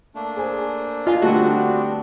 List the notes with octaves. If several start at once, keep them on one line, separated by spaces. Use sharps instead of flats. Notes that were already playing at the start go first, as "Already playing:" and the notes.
A3 A#3 D4
G#4 C5 G#5
F4 D#5 G#5
D3 G3 A3 B3 C4 D4 F#4